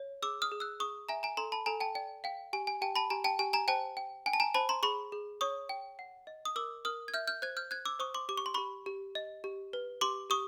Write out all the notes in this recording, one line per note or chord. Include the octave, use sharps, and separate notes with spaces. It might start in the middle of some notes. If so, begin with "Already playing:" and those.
Already playing: C#5
G#4 D6 E6
D#6 F6
G#4
E6 F#6
G#4 C#6 D#6
E5 G#5 A#5
G#5 A#5
A4 A#5 C6
A5 B5
A4 G#5 A#5
G5 A5
D5 G5
F5 G5
G4 G#5
G#5
G4 G5 A5
A5 B5
G4 G#5 A#5
G5 A5
G4 G#5
G#5 A#5
C5 G5 A5
G5
G5 G#5
A5
G#5 A#5
C5 A5 B5
A#5 C6
G#4 B5 C#6
G#4
C#5 C#6 D#6
G5
F#5
D#5
D#6
A#4 D6 E6
A#4 D#6 F6
G#6
E5 F6 G6
F6 G6
C5 F#6 G#6
F6 G6
C5 F#6 G#6
D6 E6
C5 C#6 D#6
C6 D6
G4 D6
C#6
C6
G4 B5 C#6
G4
D#5
G4
B4
G4 C6 D6
G4 C#6 D#6